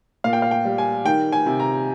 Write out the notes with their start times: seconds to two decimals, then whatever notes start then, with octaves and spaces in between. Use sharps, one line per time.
0.24 A#2 F5
0.33 G5
0.42 F5
0.51 G5
0.65 G3
0.78 G#5
1.05 D#3 G5
1.32 G#5
1.46 C3
1.60 A#5